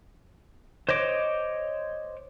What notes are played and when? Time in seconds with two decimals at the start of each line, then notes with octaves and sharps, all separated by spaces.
0.89 C5 C#5 D#5 D6